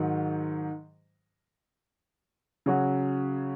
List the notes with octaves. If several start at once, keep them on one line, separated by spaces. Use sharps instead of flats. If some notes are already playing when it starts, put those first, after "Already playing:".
Already playing: G#2 D#3 F#3
C#3 F#3 C#4 F#4